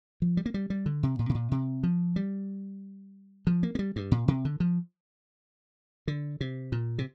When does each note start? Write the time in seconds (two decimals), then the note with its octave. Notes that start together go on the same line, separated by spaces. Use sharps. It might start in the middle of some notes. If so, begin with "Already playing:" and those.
0.22 F3
0.37 G3
0.46 A#3
0.54 G3
0.70 G3
0.86 D3
1.03 C3
1.19 A#2
1.29 C3
1.35 A#2
1.51 C3
1.83 F3
2.16 G3
3.47 F3
3.63 A#3
3.75 A#3
3.79 G3
3.96 G2
4.12 A#2
4.28 C3
4.45 D3
4.60 F3
6.08 D3
6.41 C3
6.72 A#2
6.98 C3